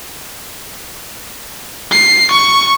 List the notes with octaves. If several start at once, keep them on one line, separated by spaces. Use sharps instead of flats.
C7
C#6